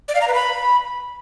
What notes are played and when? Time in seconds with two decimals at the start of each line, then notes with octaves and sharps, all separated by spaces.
0.08 D5
0.15 F5
0.21 A#5
0.28 B4
0.34 B5